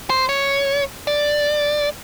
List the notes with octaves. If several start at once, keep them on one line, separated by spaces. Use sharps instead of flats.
C5
C#5
D5